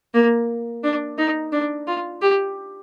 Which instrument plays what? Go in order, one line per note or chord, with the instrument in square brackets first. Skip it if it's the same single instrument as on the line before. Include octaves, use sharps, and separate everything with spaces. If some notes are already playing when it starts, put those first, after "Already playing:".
[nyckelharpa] A#3
D4
D#4
D4
F4
G4